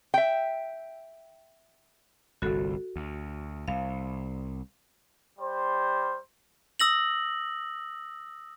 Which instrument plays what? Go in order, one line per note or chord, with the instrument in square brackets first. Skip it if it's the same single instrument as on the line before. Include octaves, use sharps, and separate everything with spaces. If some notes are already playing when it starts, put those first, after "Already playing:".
[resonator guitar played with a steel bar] E5 G5
[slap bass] G1 C2 [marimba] F#4 A4
[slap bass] D2
[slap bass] C2 [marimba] F5
[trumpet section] G3 C5
[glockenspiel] D#6 E6 A#6 F#7